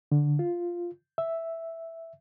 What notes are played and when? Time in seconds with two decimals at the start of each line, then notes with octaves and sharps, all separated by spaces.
0.12 D3
0.39 F4
1.18 E5